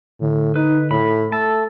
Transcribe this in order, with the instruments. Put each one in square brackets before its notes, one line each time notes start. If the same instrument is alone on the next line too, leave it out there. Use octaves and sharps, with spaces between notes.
[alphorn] A2 [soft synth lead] D3
[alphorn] D#4 [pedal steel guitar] B4
[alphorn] A2 [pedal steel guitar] B5
[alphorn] A3 [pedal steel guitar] A5 [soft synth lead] E6